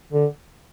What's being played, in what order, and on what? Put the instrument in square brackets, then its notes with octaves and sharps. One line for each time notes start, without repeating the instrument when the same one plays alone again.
[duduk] D3